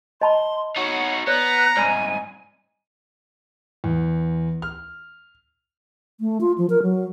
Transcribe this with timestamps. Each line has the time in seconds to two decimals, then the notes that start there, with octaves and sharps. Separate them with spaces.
0.21 D#5 A5 B5 C6
0.76 D#4 F#4 C#5
1.27 B3 C#5 D5 A#5 F#6
1.77 C2 G#2 D5 G#5 B5 D#6
3.84 E2
4.62 F6
6.20 A3
6.41 F4
6.58 F3
6.70 A#4
6.82 F#3